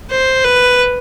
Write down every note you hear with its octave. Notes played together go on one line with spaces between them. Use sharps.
C5
B4